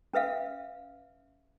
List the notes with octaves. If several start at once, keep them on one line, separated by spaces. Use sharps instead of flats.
C#4 B4 E5 F5